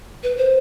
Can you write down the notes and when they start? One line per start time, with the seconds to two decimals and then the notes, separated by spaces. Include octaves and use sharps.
0.23 B4
0.37 C5